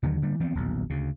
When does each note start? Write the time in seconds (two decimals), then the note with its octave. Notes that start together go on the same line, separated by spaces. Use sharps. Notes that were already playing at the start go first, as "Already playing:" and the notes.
0.03 D#2 D3 D#3 F#3
0.22 D3 G3 A#3
0.40 E3 F3 B3 C4
0.55 D#1 B1 E2
0.90 D2 C#3